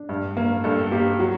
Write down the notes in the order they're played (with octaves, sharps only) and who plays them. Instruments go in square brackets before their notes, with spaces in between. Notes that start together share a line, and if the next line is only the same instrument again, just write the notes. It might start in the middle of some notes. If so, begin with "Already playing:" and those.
Already playing: [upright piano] D4
G2
A#3
G2 A4
A#3 G4
F#3 F#4